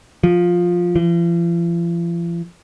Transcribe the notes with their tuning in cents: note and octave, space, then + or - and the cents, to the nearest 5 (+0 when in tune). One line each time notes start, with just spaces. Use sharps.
F3 +10
F3 -45